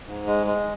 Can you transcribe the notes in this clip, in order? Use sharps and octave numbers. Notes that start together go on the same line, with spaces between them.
G#2
G#3
G#3